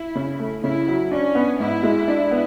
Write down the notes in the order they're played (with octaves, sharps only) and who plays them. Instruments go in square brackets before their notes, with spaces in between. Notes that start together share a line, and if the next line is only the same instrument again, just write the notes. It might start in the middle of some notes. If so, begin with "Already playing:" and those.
Already playing: [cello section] E4
[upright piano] C#3
A3
[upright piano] C#3 [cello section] E4
[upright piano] F#3
[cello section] C#4 [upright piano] D4
[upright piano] B3
[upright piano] G#2 [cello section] E4
[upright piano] G#3
D4
B3